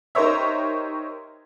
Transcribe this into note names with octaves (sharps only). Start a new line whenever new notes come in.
D#4 G4 A#4 C5 C#5 E5